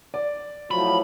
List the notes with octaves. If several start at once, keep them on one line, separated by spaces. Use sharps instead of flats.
D5
A2 F3 F#3 B5